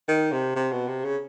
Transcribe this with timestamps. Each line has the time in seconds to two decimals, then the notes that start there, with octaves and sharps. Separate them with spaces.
0.08 D#3
0.32 C3
0.56 C3
0.72 B2
0.88 C3
1.05 C#3